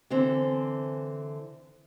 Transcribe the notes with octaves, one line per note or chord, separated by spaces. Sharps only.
D3 E3 C4